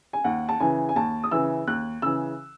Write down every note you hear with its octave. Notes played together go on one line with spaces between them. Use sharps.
G#5
D#2 F#5
A5
C#3 E3 G#5
G#5
D#2 A5
D#6
C#3 E3 E6
D#2 F#6
C#3 E3 E6